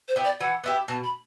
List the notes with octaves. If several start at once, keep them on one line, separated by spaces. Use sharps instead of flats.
C5
B3 E4 G4
D5
E3 F#5
B3 E4 G4
B2 A5
B5